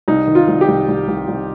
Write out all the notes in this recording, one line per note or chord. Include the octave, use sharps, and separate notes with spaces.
C2 D#4
D#3
F4
C2
G4
C2
C2
C2
C2